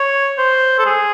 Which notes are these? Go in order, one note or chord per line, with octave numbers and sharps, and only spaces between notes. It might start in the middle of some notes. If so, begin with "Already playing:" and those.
Already playing: C#5
C5
A4
G#4